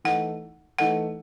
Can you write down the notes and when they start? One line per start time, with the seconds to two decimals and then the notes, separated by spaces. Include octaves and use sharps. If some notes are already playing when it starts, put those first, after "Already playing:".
0.04 E3 A3 D#4 F#5
0.78 E3 A3 D#4 F#5